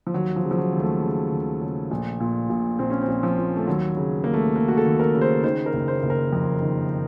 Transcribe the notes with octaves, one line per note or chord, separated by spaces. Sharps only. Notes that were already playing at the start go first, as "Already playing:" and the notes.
F3
D#2 F#3
F3
C#3
F3
F#3
D#2
A3
C#3
D#2
C#3
A#1
A#2
A#1
A#2 C4
C#4
C4
A#1
F3
A#2
A3
D#2 F#3
C#3
D#2 A#3
A3
C#3 A#3
F#4
A4
D#2
A#4
C#3
C5
D#3 C5
A#4
F#1
C5
F#1
A#4
F2
D#3